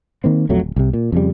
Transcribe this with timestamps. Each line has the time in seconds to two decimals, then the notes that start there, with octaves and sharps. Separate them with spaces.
0.24 D#3 A#3 C4
0.49 B1 F2 F#3 A3
0.63 D1
0.76 C2 C3
0.93 A#2
1.12 F2 C#3 G3